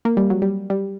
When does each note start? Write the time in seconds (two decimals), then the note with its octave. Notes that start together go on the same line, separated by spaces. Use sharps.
0.05 A#3
0.17 G3
0.30 F#3
0.42 G3
0.70 G3